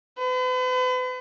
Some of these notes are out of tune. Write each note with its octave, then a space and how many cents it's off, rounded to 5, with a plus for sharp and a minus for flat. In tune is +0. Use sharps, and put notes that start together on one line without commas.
B4 +40